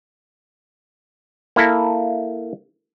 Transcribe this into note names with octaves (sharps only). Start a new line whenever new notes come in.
A#3 E4 A4